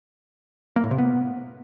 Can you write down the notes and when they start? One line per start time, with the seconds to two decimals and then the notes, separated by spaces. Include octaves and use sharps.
0.76 A#3
0.84 A2
0.91 C3
0.98 B3